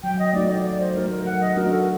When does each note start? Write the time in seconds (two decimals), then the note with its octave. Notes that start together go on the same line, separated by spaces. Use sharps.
0.03 F#3 G5
0.19 D#5
0.33 A3 D#4 F#4 D5
0.49 D5
0.64 F#3 D5
0.79 C5
0.94 A3 D#4 F#4 A#4
1.10 A#4
1.25 F#3 F#5
1.41 D#5
1.56 A3 D4 F#4 A#4
1.70 A4